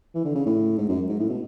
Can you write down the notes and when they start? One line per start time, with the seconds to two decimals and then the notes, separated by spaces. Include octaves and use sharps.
0.15 E3
0.25 D3
0.35 C#3
0.46 A2
0.78 G#2
0.89 F#2
1.10 G#2
1.19 A2
1.30 B2